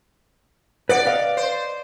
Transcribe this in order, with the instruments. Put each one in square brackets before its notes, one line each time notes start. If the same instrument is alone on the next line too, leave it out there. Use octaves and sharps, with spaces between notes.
[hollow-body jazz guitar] B4 C#5 F#5 [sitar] D5
[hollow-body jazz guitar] B4 D#5 F5
[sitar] C5